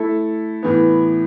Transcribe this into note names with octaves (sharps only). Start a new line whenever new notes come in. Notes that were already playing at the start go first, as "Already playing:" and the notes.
Already playing: A3 E4 A4
A2 E3 B3